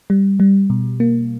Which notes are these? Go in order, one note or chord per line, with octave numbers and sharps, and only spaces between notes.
G3
G3
B2
A#3